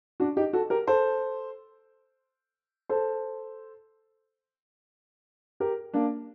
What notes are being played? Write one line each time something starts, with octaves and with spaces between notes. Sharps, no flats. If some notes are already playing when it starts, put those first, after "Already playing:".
D4 F#4
D#4 G4
F#4 A4
G4 A#4
A4 C5
A4 C5
G4 A#4
A#3 D4